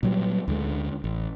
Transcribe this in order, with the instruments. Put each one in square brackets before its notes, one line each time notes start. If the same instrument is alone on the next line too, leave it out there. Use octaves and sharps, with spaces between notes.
[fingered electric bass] A#2 F#3 G3
D2 D3 G#3
A1